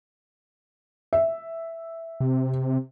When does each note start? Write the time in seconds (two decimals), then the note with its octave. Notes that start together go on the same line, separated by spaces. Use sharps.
1.13 E5
2.20 C3